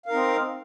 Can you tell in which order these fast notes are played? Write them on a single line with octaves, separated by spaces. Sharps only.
F5 A#4 D#4 C4